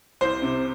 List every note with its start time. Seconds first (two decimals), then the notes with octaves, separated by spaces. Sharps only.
0.21 C2 C5
0.42 C3